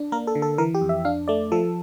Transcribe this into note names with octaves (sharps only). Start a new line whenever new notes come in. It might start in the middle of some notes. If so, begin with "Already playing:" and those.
Already playing: D4
A#3 A#4
A4
D3
A4
E3 A#4
G4
F2
E5
D4 F5
A3 D5
F3 A4